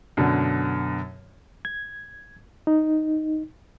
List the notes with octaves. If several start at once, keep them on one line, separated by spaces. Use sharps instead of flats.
F#2 B2 D3
G#6
D#4